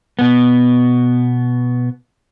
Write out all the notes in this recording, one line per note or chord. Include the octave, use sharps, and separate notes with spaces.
B2 B3